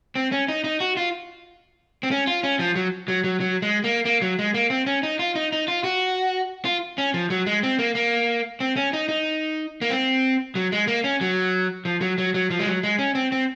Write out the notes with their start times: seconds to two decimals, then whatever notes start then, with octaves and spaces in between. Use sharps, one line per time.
0.15 C4
0.32 C#4
0.48 D#4
0.64 D#4
0.80 F#4
0.97 F4
2.03 C4
2.11 C#4
2.27 F4
2.43 C#4
2.59 F3
2.76 F#3
3.08 F#3
3.24 F#3
3.40 F#3
3.62 G#3
3.84 A#3
4.05 A#3
4.22 F#3
4.39 G#3
4.54 A#3
4.70 C4
4.86 C#4
5.03 D#4
5.19 F4
5.35 D#4
5.52 D#4
5.68 F4
5.84 F#4
6.65 F4
6.98 C#4
7.14 F3
7.30 F#3
7.47 G#3
7.63 C4
7.79 A#3
7.95 A#3
8.60 C4
8.77 C#4
8.93 D#4
9.09 D#4
9.82 A#3
9.90 C4
10.55 F#3
10.72 G#3
10.88 A#3
11.04 C#4
11.21 F#3
11.85 F3
12.01 F#3
12.18 F#3
12.34 F#3
12.50 F3
12.59 G#3
12.66 F#3
12.83 G#3
12.99 C#4
13.15 C4
13.32 C4